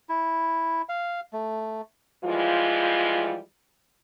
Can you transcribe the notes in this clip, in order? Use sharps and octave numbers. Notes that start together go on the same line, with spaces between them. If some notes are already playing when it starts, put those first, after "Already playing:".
E4
F5
A3
E3 F3 G3 G#3 F4